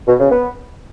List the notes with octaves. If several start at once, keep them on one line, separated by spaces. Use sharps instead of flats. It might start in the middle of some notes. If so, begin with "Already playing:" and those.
B2
C#3
B3